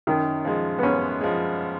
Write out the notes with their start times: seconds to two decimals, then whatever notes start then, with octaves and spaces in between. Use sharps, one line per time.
0.07 F#2 D#3
0.45 F3 G#3
0.79 B3
0.83 F#2 C#4
1.21 F3 G#3